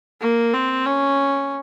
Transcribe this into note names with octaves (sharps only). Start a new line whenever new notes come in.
A#3
C4
C#4